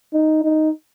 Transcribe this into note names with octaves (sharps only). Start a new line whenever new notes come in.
D#4
D#4